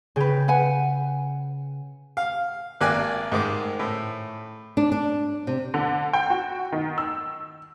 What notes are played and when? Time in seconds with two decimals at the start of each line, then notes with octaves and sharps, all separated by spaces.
0.16 C#3 G#4 B4 G5
0.48 B4 F#5 G#5
2.17 F5
2.81 G#1 A#3 D5 G#5 F#6
3.32 G#2 D#3 G#3 D6
3.79 A2
4.77 D4
4.92 D4
5.47 C3
5.74 D3
6.13 G5
6.30 F#4
6.72 D#3
6.98 E6